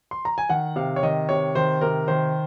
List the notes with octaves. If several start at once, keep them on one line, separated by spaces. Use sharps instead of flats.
C6
A#5
G#5
D#3 F#5
C3 F5
C#5
D#3 D#5
C3 C#5
D#3 C5
C3 A#4
D#3 C5